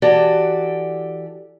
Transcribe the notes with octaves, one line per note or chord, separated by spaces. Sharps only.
E3 F#4 G4 A4 D5